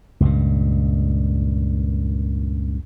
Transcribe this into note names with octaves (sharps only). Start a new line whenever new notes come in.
C#2 G2 A#2